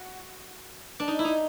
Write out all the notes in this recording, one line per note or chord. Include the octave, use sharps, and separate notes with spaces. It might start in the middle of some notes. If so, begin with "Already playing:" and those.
Already playing: F#4
D4
D#4
E4
D#4